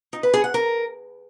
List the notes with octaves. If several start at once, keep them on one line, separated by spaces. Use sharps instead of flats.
D#4
B4
G#4
F#5
A#4